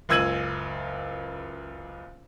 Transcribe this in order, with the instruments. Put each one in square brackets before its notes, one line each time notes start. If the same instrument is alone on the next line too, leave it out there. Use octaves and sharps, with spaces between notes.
[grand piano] F#1 C#2 E6 G#6 D#7 F#7